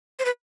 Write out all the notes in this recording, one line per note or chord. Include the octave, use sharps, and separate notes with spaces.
C5
B4